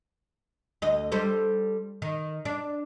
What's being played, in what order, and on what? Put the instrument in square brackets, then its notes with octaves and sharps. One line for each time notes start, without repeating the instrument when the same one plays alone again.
[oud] D2 D#5
G3 A4 C5
D#3
D4